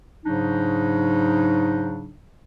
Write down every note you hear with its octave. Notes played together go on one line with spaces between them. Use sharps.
G#2 C#3 F#3 D4 D#4